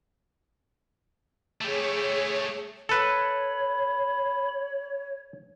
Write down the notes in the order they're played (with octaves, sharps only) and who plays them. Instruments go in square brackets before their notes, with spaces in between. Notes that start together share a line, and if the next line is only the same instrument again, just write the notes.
[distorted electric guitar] A3 G4 [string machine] G#4 C#5
[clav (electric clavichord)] A4 B4 [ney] C#5 [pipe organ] B5